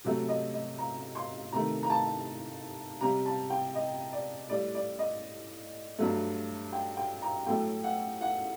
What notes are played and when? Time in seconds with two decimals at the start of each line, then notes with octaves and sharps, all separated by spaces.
0.04 C3 F#3 A3
0.29 D#5
0.54 D#5
0.78 A#5
1.15 C6
1.52 C3 D#3 A3 A#5
1.83 A#5
1.90 A5
3.01 C3 G3 A#5
3.26 A5
3.50 G5
3.75 D#5
4.13 D5
4.49 A2 G3 D5
4.75 D5
4.99 D#5
5.98 G2 F#3 A3
6.73 G5
6.97 G5
7.22 A#5
7.46 A2 F#3 A3 G5
7.84 F#5
8.21 F#5